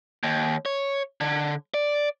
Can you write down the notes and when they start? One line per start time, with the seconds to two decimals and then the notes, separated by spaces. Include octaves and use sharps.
0.23 D#2
0.66 C#5
1.21 D3
1.74 D5